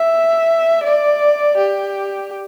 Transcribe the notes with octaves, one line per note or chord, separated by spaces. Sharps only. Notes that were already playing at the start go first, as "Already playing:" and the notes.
Already playing: E5
D5
G4